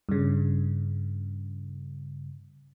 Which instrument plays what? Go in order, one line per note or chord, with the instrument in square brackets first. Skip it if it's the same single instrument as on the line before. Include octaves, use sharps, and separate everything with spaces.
[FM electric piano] G2 C#3